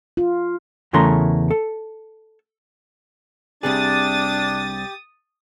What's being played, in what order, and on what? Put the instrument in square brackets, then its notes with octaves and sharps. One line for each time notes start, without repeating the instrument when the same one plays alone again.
[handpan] F4
[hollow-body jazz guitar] E2 C#3 E3 A3 A#4 C6
A4
[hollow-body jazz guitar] C2 C3 G#4 [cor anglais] D4 [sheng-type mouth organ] G4 [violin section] D#6 A6